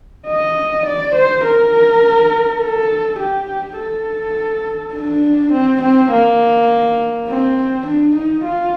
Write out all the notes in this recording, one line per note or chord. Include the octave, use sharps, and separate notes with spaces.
D#5
D5
C5
A#4
A4
G4
A4
D4
C4
C4
A#3
C4
D4
D#4
F4